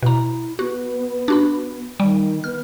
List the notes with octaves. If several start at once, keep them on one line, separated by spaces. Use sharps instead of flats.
B2 E4 A#5
B3 F#4
D4 F#4 B5
D#3 G3
B3 F6